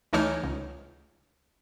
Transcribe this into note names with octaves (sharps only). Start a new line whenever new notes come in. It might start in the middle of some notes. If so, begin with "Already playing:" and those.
D2 E3 A3 D#4 C#5 F6
C#2